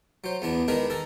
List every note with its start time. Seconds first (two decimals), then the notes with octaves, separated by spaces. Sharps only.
0.24 F#3 C5
0.42 E2 B3 D4
0.68 D#3 G#3 D4 A#4 B4
0.90 A4 A#4